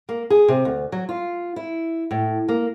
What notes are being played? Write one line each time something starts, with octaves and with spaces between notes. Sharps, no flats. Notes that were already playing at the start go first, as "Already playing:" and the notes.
A#3
G#4
C3
D2
F#3
F4
E4
A2
A#3